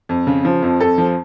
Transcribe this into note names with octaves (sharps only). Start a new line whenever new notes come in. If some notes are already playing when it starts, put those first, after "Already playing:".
F2
C#3
F3
F2
F2 A4
F3